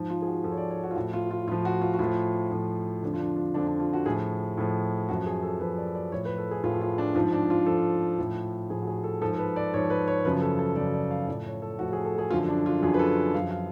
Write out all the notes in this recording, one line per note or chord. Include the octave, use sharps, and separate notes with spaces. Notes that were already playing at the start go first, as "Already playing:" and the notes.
Already playing: G#2 F3
F4
G#4
F#4
G#2 F3 A4
C#5
D5
C#5
F#4
F4
A2 F3 F#4
F4
F4
A2 F3 F4
F#4
F4
F#4
A2 F3 F4
A2 F3
F2 D3 F3 D4
F4
D4
F4
F2 D3 F3 D4
D4
F4
F#4
A2 F3 G#4
A2 F3
F#2 F3 F#4
G#4
A4
F#2 F3 B4
D5
D5
A2 F3 C#5
B4
A4
G#4
A2 F3 F4
F4
D4
G#2 F3 F4
D4
F4
G#2 F3 A4
A2 F3
A2 F3 G#4
F#4
G#4
A4
G#2 F3 A4
A4
B4
D5
G#2 F3 C#5
B4
C#5
F#2 C#3 F3 B4
A4
A4
F#2 C#3 F3 D5
D5
F5
A2 F3 D5
C#5
A4
A2 F3 F#4
G#4
A4
G#4
F#2 D3 F3 F4
D4
F4
F#2 D3 F3 G#4
B4
A4
F#2 F3 F5
F5